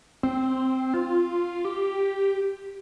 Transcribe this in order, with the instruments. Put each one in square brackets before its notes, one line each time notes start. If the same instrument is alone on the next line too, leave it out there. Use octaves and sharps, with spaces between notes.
[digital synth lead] C4
F4
G4